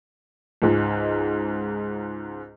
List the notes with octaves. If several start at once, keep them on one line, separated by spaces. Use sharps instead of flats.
C#2 G#2